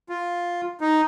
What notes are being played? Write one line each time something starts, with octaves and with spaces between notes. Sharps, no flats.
F4
D#4